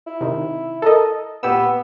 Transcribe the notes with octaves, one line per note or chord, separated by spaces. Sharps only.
E4
C3 D#3
A4 A#4 D#5
A#2 B3 G4 E6